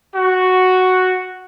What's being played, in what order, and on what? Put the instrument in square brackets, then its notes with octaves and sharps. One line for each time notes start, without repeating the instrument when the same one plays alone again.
[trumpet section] F#4